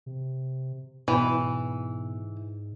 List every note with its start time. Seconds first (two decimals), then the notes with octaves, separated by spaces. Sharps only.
0.06 C3
1.08 G#2 B2 E3